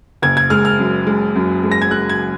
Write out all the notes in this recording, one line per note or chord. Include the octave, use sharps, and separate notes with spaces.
F#1 G#6
G#6
G#3 F6
F6
F#2
G#3
F#2
G#3
A#6
G#6
G#3 F#6
G#6